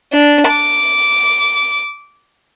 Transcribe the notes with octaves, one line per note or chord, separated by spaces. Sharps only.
D4
D6